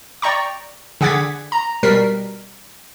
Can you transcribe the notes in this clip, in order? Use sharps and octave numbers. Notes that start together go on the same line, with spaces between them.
D5 G5 A#5 C#6
D3 G#4 F#5 D6 G#6 B6
A#5
B2 G3 A#4 B6 C7